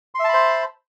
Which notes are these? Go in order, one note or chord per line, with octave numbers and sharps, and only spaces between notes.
C5 E5 A5 B5 C6